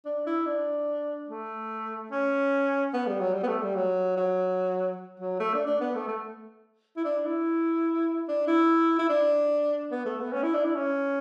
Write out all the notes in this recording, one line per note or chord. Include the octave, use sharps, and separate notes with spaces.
D4
E4
D4
A3
C#4
B3
G3
F#3
G3
B3
A3
G3
F#3
F#3
F#3
A3
D4
D4
B3
A3
A3
E4
D4
E4
D4
E4
E4
D4
B3
A3
B3
C#4
E4
D4
E4
C#4